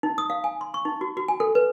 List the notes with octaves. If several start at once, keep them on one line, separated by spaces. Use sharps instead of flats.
D#4
D#6
F5
G#5
C6
C#6
D#4
F#4
F#4
G#5
A4
B4